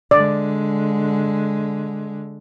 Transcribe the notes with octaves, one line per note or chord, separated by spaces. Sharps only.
D3 G#3 D5